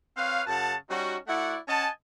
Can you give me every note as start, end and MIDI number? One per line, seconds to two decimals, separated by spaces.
0.17 0.42 60
0.17 0.42 71
0.17 0.42 73
0.17 0.42 77
0.47 0.74 42
0.47 0.74 49
0.47 0.74 78
0.47 0.74 81
0.90 1.16 55
0.90 1.16 61
0.90 1.16 63
0.90 1.16 66
1.28 1.56 57
1.28 1.56 64
1.28 1.56 66
1.28 1.56 74
1.28 1.56 78
1.68 1.88 61
1.68 1.88 75
1.68 1.88 78
1.68 1.88 80
1.68 1.88 81